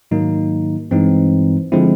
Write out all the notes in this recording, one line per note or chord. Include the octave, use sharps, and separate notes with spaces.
G#2 D#3 F#3 A#3 D#4
G2 E3 G#3 C4 D#4
D3 F3 G#3 C4 E4